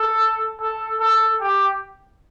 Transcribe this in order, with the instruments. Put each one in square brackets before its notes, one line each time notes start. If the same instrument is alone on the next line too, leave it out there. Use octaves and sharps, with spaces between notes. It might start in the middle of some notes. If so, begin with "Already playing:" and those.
Already playing: [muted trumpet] A4
A4
A4
G4